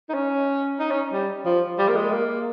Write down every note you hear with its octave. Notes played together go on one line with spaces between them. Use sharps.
D#4
C#4
D#4
C#4
G3
F3
G3
A#3
G#3
A#3